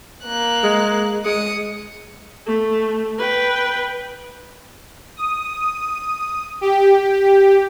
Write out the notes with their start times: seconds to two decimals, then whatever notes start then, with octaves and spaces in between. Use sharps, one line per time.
0.25 A#3 F#6
0.63 G#3
1.25 G#3 D#6 C#7
2.47 A3
3.19 B4 G5
5.17 D#6
6.61 G4